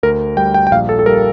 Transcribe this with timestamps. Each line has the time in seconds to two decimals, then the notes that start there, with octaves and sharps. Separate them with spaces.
0.03 D2 A#4
0.37 G3 G5
0.54 G5
0.67 G5
0.71 A#1 F5
0.89 A4
0.99 A4
1.06 G3 A#4